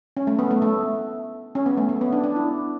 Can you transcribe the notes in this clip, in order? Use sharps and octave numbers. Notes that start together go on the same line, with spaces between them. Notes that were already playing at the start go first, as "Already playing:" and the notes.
C#4
A3
B3
A3
A3
C#4
B3
A3
B3
B3
D4
D4
E4